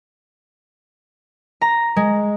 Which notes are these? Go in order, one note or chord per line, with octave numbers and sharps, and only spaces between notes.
A#5
G#3